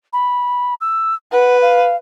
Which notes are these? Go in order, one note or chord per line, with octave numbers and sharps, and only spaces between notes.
B5
E6
B4 F#5
F5